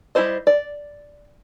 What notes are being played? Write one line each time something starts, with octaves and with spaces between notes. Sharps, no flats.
G3 E4 F4 C5 D#5
D5